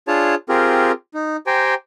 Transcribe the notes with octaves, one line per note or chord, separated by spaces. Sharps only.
D4 F4 G#4 C#5 A5
C4 F4 G4 G#4 A#4
D#4
G4 C5 G5 G#5 A#5